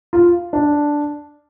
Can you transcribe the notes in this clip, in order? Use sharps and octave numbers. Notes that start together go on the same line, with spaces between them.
F4
D4